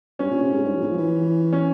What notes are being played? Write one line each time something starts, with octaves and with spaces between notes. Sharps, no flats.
G2 C#4
A#2
C3
G#2
G2
F2
A#2
G#2
F3
E3
C#4